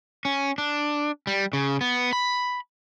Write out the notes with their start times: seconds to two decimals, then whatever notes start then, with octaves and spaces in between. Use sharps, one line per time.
0.25 C#4
0.58 D4
1.27 G3
1.53 C#3
1.81 B3
2.13 B5